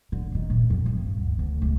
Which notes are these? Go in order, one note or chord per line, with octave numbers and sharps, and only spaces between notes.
D3
D#3
A#1
F2
G2
D2
D2
C#2